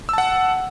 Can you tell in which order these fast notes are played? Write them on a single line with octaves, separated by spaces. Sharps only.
E6 A5 F#5